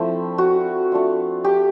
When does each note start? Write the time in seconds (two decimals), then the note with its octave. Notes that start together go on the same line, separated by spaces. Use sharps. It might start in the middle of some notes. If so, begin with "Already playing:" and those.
Already playing: F3 A3 C4 D4 E4
0.38 F#4
0.92 A3 D4 F4
1.44 G4